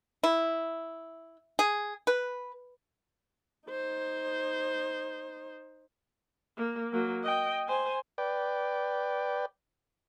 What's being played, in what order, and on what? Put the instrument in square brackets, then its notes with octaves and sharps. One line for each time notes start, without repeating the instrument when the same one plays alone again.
[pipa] E4
G#4
B4
[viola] D#4 C5
A#3
F#3 A#3
D#5 G5
C5 G#5
[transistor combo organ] B4 D5 G5